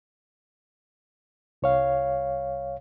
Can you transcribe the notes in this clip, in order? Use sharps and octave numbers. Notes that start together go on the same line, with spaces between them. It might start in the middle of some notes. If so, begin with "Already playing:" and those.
C2 C#5 F5